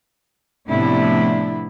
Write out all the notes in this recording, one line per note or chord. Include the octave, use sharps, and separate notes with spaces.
A2 C3 F3 B3 D4 E4